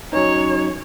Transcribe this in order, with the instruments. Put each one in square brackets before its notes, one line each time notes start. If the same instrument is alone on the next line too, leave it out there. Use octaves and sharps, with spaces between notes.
[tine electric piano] F#3 C#4 D#4 [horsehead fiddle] C#5